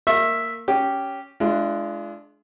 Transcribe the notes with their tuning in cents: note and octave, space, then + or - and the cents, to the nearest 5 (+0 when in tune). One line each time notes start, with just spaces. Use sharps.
A#3 -15 E5 +0 C#6 -35
C#4 +0 G4 -5
G#3 +25 D4 +0 F4 -40